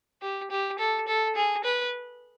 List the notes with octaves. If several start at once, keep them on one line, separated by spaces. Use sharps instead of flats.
G4
G4
A4
A4
G#4
B4